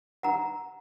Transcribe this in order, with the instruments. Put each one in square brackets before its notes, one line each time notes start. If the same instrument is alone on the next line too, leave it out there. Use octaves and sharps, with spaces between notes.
[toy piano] F#5 A#5